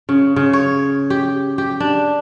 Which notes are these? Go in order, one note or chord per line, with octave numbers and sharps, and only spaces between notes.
C#3
C#3
C#5
G4
G4
D4